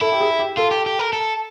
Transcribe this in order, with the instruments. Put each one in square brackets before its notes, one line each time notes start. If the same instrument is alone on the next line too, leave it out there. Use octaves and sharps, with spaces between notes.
[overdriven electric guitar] E4 [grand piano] A4
[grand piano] G4
G#4
G4
[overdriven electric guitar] F4 [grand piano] A4
[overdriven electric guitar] G4
G4
A#4
A4